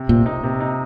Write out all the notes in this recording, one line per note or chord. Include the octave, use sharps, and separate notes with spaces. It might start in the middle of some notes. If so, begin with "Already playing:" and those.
Already playing: C3
A#2 C4
D#4
C3
D#4